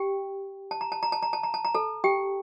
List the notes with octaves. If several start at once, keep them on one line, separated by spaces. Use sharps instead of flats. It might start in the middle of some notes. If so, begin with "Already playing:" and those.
Already playing: G4 G5
A5
A#5
A5
A#5
A5
A#5
A5
A#5
A5
A#5
A4 A5
G4 G5